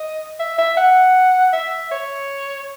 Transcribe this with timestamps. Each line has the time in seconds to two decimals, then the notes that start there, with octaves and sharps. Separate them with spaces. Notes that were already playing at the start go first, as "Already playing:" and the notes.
Already playing: D#5
0.39 E5
0.58 E5
0.77 F#5
1.53 E5
1.91 C#5